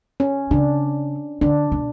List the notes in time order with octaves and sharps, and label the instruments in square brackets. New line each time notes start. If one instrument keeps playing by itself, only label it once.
[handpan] C#4
[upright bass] C#3 [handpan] D4
[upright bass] D3 [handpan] D4
[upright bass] B2